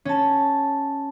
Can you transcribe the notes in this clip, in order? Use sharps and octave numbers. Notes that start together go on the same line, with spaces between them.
C#4 A5